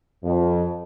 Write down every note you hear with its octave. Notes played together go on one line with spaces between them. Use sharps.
F2